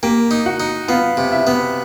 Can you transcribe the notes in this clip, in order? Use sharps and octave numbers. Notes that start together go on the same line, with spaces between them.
A#3 G4 G5
D#4
F#4 F#5
D#4
B3 F4 F5
C3
E4 E5
B3